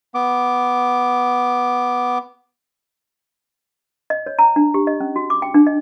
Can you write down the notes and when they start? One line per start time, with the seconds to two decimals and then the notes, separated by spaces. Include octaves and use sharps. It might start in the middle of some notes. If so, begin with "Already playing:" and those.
0.15 B3 D6
4.10 D#5
4.26 C#5
4.39 A#5
4.56 D4
4.74 G4
4.87 D#5
5.00 C#4
5.16 F#4
5.30 D6
5.42 G5
5.54 D4
5.67 D#5